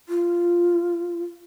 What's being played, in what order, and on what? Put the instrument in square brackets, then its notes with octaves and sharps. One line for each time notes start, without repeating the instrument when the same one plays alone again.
[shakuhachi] F4